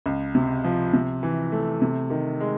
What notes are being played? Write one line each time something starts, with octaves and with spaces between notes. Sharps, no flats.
C#2
C3
F3
C3
E3
A3
C3
D#3
G#3